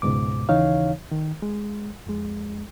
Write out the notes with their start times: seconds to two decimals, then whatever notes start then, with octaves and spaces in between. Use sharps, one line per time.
0.02 C#2 G#2 B2 D6
0.49 D#2 C#3 E3 D#4 C#5 F5
1.11 D#3
1.42 G#3
2.07 F2 G#3